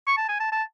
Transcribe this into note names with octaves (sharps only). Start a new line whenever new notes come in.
C#6
A5
G#5
A5
A5